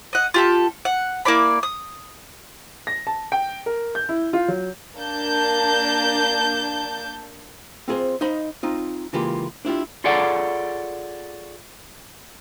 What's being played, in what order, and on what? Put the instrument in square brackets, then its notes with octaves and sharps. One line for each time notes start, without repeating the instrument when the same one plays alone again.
[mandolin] D#5 F#5
F4 G4 A4
F#5
A#3 E4 D5 B5
D#6
[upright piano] A#6
A5
G5
A#4
G6
E4
F4
F#3
[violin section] A#3 D4 A5 G6
[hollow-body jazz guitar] C4 F4 G#4 A4 C5
D#4 C5 D#5 F5 B5
C4 D#4 F4
C#3 E3 G#3 A#3 F4 G4
D4 E4 F4 G4
[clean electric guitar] F4 G#4 A4 C#5 D5 F#5